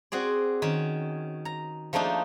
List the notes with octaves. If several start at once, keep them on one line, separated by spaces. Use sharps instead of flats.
C4 F#4 G#4 D5
D#3 C#4
A#5
F3 A3 A#3 D4 D#4